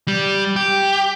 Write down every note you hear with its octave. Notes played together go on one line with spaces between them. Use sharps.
G3
G4